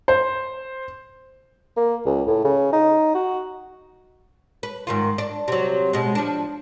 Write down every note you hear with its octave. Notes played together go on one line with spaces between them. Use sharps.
C5
A#3
C#2
A2
C#3
D#4
F#4
B4
G#2 D#3 F4
D4
C3 F#3
B2 G#3
F3 D4